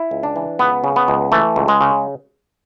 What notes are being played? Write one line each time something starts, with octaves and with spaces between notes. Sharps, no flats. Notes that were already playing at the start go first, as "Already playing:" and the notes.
Already playing: E4
C#2
D4
E3
C#2 B3
C#3
B3
C#2
E3 A3
C#2
G#3
C#3